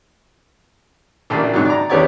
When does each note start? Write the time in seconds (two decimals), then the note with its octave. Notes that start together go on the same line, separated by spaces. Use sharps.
1.30 A1 A#2 D4
1.53 G#2 C3 F#3
1.65 D5 A#5
1.90 E2 C#3 B3 G4 C#5 D5